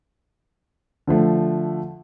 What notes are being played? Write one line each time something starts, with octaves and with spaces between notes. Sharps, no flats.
D3 F3 A3